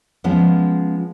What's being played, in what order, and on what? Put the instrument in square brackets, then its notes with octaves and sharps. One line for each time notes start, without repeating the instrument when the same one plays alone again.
[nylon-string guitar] F3 G#3 B3 C#4